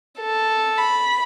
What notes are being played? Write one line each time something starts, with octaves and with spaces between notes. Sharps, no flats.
A4
B5